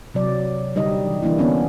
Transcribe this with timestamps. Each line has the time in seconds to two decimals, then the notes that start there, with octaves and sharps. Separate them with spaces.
0.14 C3 F#3 D5
0.75 D3 G3 D#4 D#5
1.06 E3
1.22 E3 A#3 D4 E4
1.38 D3 B3 C#4 D4